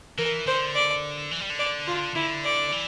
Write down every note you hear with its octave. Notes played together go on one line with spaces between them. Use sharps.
E3 A#4
D3 C5
D5
E3
G3
D3
D5
F4
D3 E4
D5
E3